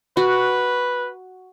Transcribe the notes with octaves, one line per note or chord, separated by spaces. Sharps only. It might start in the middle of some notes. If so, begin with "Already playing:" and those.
F#4 B4